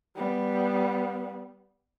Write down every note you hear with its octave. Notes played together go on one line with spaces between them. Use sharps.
G3 B3